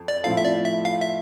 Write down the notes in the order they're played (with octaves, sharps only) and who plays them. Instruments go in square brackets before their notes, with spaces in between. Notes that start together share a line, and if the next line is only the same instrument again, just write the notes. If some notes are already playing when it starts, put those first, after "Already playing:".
Already playing: [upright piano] F2
[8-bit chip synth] D5
[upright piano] A2 F3 C4 E4 A4 [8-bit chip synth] F5
[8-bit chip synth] E5
D5
E5
F5
E5